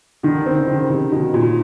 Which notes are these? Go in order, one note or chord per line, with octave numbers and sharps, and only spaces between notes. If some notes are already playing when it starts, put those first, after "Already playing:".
D3 D#3
D3
C4
C#3
D#3
C#3
C3 D#3
B2 D#3
A#2 A#3